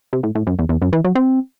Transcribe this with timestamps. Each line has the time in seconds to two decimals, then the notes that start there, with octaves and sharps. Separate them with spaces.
0.13 C3
0.23 A2
0.35 A2
0.47 F#2
0.59 E2
0.69 E2
0.82 F#2
0.93 E3
1.04 F#3
1.15 C4